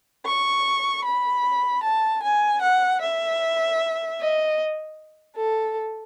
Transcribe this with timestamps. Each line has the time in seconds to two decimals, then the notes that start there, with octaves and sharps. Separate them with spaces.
0.26 C#6
1.05 B5
1.84 A5
2.23 G#5
2.62 F#5
3.02 E5
4.19 D#5
5.36 A4